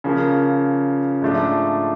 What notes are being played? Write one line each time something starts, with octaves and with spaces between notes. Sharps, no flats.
C#3 F3 A#3
G#2 F3 A3 D4